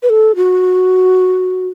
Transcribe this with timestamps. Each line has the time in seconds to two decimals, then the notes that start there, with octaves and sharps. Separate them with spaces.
0.02 B4
0.09 A4
0.35 F#4